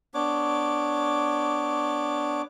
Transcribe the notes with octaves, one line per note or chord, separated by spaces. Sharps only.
B3 D4 C#5 D6